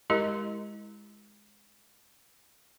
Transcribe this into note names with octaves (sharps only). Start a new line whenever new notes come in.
G#3 E4 G4 A#4 D#5 A#5